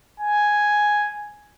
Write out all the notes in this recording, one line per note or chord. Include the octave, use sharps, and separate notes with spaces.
G#5